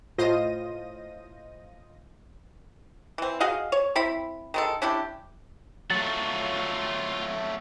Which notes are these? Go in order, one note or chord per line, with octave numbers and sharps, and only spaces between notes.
A2 F4 C5 D#5 A#6 D#7
E3 C4
F#4 G#4 D#5 F5
C#5
C4 E4 B5
D#3 G#3 A4
C#4 D4 E4 G4
F#3 A3 F4 F#5 A6